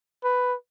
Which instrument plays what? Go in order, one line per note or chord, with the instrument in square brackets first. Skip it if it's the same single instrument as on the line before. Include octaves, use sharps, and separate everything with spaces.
[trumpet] B4